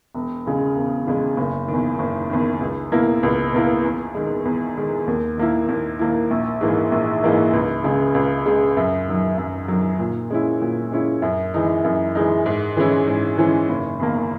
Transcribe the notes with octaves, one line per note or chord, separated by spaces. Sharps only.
E1
E2 C#3 G#3
E1
E2 C#3 G#3
F#1
D#3
E2
F#1
E2 D#3
C#2
B2 A#3 E4
C#2
B2 A#3 E4
E2
D#3 G#3
E2
D#3 G#3
D#2
D#3 A#3 E4
D#2
D#3 A#3 E4
A#1
G#2 E3 A#3 D#4
A#1
G#2 E3 A#3 D#4
C#2
C#3 G#3
C#2
C#3 G#3
F#2
D#3 F#3
F#2
D#3 F#3
A#2
G#3 C#4 E4
A#2
G#3 C#4 E4
F#2
E3 G#3 D#4
F#2
E3 G#3 D#4
G#2
E3 G#3 C#4 E4
G#2
E3 G#3 C#4 E4
F#1
E2 D#3 A#3